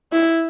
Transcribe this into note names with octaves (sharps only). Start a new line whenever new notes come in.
E4